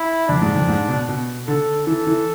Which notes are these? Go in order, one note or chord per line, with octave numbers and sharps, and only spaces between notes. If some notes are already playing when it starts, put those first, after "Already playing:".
Already playing: E4
F2 D4
G#2
F2
G#2
B2
B2
D3 A4
E3 A4
E3